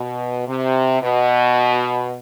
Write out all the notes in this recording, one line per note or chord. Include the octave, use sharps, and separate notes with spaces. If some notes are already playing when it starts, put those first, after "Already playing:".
Already playing: B2
C3
B2